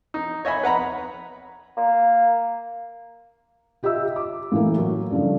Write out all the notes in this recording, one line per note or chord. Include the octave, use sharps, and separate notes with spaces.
D#4
C#5 D#5 E5 G#5 B5
B4 F#5 A#5 B5
A#3
F4 G4 D#5 E5 E6
D6
A2 E3 A#3
F#3
G2 C#3 F3 A3